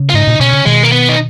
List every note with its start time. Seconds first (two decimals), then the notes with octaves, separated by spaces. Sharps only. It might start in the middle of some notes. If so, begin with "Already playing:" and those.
Already playing: C#3
0.10 F4
0.13 G#2 D#4
0.27 A#2
0.39 B2 C#4
0.52 C#3
0.65 B2 D#3 G#3
0.83 A#3
0.92 B3
1.09 D#4